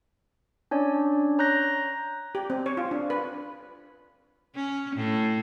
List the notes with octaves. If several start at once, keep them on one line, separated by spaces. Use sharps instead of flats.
C#4 D4 C#5 D5
C#5 A#5 F#6 G6 A#6
G4
C4
C#5
F4
D4
B4
C#4
A2